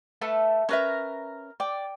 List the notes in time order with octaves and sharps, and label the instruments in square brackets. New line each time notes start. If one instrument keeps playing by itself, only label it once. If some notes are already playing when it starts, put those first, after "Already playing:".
[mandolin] A3 A4 B4
[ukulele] C#4 B4 E5 [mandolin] A#4 A#5
[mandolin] D5 [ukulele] G5